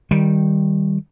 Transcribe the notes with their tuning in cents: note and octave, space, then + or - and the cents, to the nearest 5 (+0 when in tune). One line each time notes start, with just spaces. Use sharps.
D#3 +0 G3 +0